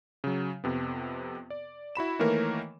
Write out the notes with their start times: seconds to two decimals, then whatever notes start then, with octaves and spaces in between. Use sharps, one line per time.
0.24 C#3 F#3
0.64 F2 C3 B3
1.50 D5
1.95 E4 F#4 B5 E7
2.19 D#3 E3 A3 A#3 A#4 C#5